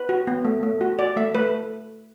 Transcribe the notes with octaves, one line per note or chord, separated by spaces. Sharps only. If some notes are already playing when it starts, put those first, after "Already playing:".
Already playing: B4
F#4
B3
A3
A3
F#4
F#4 D5
A3 E5
A3 B4